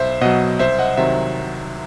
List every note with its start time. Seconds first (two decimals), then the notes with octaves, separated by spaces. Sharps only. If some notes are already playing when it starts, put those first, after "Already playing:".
Already playing: B1 C5 E5
0.21 B2 F#3 D#5 F#5
0.59 C2 C5 E5
0.79 D#5 F#5
0.97 C3 D#3 F#3 C5 E5